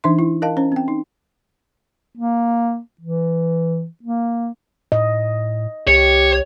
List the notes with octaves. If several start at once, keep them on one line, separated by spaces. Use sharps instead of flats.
E3 D4 D#4 E5 C6
E4
A#4 D#5 F5 A5
C#4 C5
C4 G5
D#4
A#3
E3
A#3
A2 D#5
C2 G4 C#5